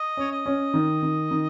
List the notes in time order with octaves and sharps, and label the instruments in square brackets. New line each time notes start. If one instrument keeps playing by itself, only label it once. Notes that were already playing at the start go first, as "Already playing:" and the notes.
Already playing: [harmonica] D#5
[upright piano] C#4 [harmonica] C#5
[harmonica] D#5
[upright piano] C#4
D#3
D#3
D#3